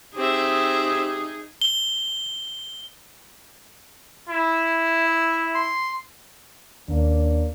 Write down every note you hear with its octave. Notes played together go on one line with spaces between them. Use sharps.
C4 D#4 G4 G#4 E5
G7
E4
E5
C6
D#2 A#3 C#4 D4